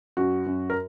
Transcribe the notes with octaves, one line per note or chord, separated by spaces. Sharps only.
F#2 F#4
F#2
A#4